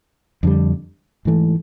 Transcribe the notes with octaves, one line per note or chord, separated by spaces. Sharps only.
F2 D3 G3
G#2 E3 A3